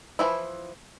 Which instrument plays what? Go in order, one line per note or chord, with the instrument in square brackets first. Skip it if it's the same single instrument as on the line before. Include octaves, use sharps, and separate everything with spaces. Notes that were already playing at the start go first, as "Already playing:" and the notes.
[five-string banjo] E3 F3 E4